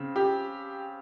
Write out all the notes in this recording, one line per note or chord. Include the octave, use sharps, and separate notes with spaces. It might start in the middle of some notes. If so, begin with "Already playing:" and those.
Already playing: C#3 C4
G4